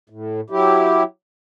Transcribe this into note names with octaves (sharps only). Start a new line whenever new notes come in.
A2
F#3 E4 G4